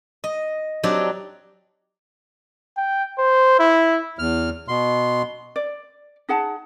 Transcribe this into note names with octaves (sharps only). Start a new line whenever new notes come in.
D#5
F#3 C4 D4 D#4 G4 D5
G5
C5
E4
E2 F6
B2 C6
D5
D#4 G#4 F#5 A5